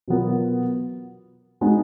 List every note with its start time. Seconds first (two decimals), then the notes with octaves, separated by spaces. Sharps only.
0.08 B2 F#3 B3 F4 A#4
1.61 G#3 B3 D#4 F#4